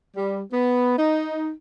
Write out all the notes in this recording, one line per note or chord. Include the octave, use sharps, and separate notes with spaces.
G3
B3
D#4